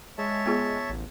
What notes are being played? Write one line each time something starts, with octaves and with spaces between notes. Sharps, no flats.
G#3 C#5 E5 A5
B3 F4 G#4
A1